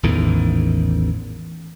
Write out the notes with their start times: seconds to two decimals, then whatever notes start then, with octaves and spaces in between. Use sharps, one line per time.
0.03 A1 E2 G#2 D#3